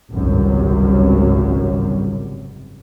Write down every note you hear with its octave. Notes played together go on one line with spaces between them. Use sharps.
G#1 C#2 F#2 C3 G3